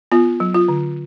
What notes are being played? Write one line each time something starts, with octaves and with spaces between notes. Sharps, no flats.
B3 F4
F#3
F4
D3